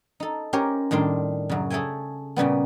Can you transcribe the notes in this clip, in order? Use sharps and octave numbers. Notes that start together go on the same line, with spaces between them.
D#4 A4
C#4 G4 A#4 C5 C#5 G5
A2 D#3 G3 D4 C6
F#2 C#3
G#4 A4 C#5 E5 G5 G#5
A#2 C#3 G3 B3